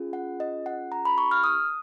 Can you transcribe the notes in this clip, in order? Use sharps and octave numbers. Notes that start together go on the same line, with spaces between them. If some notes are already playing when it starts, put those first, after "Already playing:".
Already playing: C#4 F4 G#4
F#5
D#5
F#5
A#5
B5
C#6
F6
D#6